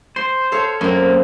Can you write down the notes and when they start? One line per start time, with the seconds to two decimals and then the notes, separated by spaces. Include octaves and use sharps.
0.16 C5 C6
0.52 A4 C#5 F5
0.81 F#2 A#3 C4